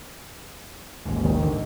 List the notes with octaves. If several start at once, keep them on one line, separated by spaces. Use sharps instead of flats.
A1 D#2 G#2
D#3
D3